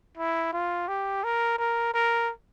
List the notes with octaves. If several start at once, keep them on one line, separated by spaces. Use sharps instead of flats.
E4
F4
G4
A#4
A#4
A#4